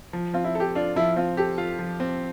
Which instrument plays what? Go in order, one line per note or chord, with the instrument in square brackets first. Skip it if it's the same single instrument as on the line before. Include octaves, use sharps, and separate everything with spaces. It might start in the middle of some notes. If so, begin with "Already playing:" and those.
[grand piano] F3
[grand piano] C4 [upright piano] F4
[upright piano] E4
[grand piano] A4
[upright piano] G4
[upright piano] D4 [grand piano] F4
[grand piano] F3 [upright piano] E4
[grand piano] C4 [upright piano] F4
[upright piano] G4 [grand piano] A4
[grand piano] F4
F3
C4